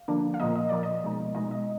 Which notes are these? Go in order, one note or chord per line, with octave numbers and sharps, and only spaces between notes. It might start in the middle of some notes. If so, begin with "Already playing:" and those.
Already playing: F5
D3 F3 A#3 D4
F5
A#2 F3 A#3 D#5
D#5
A#2 F3 A#3 D5
D#5
B2 G#3 D#4
B2 G#3 D#4 D#5
D#5